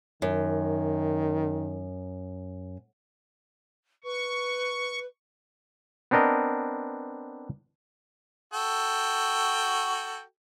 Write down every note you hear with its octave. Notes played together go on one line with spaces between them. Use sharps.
F#2 D#3
B4 C#6
B3 C4 D4 A#4 D#5
F#4 A4 G5